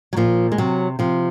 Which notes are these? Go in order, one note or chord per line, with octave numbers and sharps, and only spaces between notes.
F#3
A#2 F3
G#3
C3 F#3
C3 F3